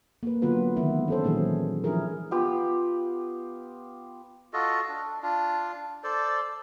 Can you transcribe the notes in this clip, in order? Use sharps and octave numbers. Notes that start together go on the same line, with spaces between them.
A#3 B4
D3 F#3 B3 F4 B4
D#3 E3 G#3 A3 B3 E4
C#4 A4 C5
A#2 D#3 E3 F#3 G#3 G#4
E3 F3 D4 E4 G#4 A#4
B3 F4 G4
F4 F#4 A4 D#5
D4
D4 F4
A4 C5 D5